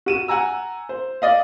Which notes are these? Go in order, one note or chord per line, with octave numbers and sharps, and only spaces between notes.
F#4 D#7 E7
F#5 G#5 A#5 E6
C5
D5 D#5 F5